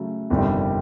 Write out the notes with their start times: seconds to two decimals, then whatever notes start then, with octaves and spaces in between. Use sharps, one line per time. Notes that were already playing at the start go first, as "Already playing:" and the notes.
Already playing: C#3 F#3 A3
0.30 G1 F2 C3 D#3 G3